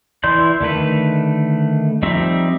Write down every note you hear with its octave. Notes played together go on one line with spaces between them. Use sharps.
E3 E4 D5 C6 G6
D3 D#3 A3 B4
F3 G3 C4 D#4 E5